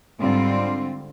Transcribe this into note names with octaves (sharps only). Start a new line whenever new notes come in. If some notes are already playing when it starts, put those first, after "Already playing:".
G#2 D3 G3 C4 F4